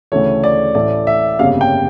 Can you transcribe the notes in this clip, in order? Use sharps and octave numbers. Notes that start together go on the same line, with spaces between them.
D2 C#3 E3 A3 C#5
D5
A1 A2 E3 A3 D5
E5
G1 F2 C#3 G3 A#3 F5
G5